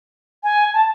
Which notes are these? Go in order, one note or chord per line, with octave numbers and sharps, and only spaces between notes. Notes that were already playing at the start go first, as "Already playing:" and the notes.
G#5
A5